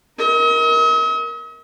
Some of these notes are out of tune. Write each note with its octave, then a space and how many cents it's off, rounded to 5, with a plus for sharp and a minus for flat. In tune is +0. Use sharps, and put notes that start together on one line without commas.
A#4 +10 D#5 +45